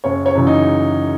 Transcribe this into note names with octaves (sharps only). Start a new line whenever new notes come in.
F#1 C#5
C#5
F#2 C#3 E3
D#4